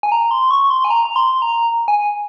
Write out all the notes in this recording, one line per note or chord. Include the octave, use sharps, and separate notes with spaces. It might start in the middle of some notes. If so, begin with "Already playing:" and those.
G#5
A#5
C6
C#6
C6
G#5
A#5
A#5
C6
A#5
G#5